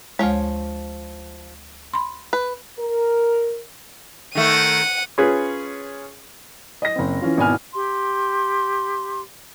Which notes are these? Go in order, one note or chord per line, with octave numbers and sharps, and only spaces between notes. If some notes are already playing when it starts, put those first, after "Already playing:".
D2 F3 G#3 C#5
B5 C6
B4
A#4
D#3 A3 F#5 D#7
C#4 F4 G#4 B4
D#5 A#6
F#1 C4
E3 C#4 F4
G#1 B2 E4 G#5 F6
G4 C6